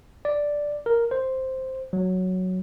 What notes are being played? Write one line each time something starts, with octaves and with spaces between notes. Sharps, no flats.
D5
A#4
C5
F#3